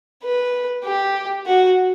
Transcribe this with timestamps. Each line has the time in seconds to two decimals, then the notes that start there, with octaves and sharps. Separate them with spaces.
0.23 B4
0.83 G4
1.46 F#4